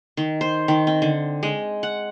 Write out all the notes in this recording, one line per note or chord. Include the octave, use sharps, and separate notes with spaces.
D#3
C5
D#3
C4
D3
G#3
F#5